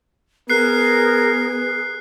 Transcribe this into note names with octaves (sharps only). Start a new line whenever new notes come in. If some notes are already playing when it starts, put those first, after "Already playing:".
B3 G#4 A#4 F#6 C7